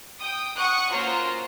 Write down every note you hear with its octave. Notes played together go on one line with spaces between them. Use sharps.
G5 D#6
F#5 C#6 D#6 F#6
A#3 C#4 F4 F#4 A#4 C5